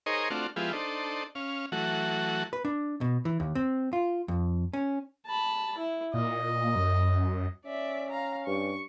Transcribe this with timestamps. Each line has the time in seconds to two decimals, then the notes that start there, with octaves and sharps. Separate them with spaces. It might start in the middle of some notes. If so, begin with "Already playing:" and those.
0.06 D#4 G#4 A#4 C5 C#5 D#5
0.30 A3 C4 D4 F4 F#4
0.56 F3 G#3 B3 E4 F4 G4
0.73 D4 D#4 A4 C5
1.35 C#4 F5
1.72 E3 F#3 A3 F#4
2.53 B4
2.65 D4
3.01 B2
3.25 E3
3.40 D#2
3.55 C4
3.93 F4
4.28 F2
4.73 C#4
5.27 A5 B5
5.77 E4
6.14 A#2 D#5
6.75 F#2
7.65 C#4 D5 E5
8.11 F5 A#5
8.47 G2 C#6